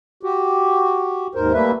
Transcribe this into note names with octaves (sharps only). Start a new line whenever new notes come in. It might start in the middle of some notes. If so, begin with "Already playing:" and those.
F#4 G4
D#2 G#2 A#4 C5
G3 A3 A#3 B4 E5